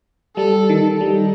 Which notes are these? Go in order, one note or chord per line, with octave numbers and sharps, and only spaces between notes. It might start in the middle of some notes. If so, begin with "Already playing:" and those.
G3 A4
D#3
G3 D#4